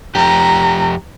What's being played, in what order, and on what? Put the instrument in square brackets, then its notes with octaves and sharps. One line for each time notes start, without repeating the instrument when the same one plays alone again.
[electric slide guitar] F2 G4 [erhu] A#5